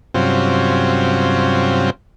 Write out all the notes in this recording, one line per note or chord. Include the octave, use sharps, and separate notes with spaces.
G2 C3 F#3 C4 C#4 F4